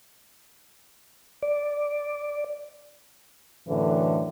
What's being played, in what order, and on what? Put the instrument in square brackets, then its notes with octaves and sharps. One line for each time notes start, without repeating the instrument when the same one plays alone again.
[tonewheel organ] D5
[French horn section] F#2 A2 D3 E3